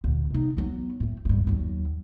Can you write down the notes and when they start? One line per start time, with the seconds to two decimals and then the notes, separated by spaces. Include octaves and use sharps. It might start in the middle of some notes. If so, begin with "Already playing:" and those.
0.04 D2 A#2
0.30 C3 D#4
0.57 F#3 B3
1.00 A2 A3
1.25 G2 A3
1.47 D#2 F#3